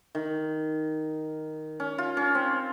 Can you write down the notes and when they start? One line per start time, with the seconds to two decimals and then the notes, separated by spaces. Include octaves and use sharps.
0.15 D#3
1.80 C#4
1.98 F4
2.17 C#4
2.35 C4